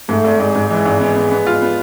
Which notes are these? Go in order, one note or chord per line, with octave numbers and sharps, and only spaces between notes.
G#2 A3
G#1
G#1 G#3
G#2
E3 G#3
G#1
B3
B3
B3
F4
B3